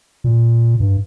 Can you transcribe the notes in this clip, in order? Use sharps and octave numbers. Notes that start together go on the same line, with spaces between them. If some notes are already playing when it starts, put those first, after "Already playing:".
A#2
G2